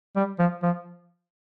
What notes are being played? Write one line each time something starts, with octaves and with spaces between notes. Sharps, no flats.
G3
F3
F3